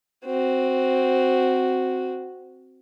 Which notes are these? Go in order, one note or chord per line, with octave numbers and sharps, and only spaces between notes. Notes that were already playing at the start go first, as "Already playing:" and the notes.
C4 F#4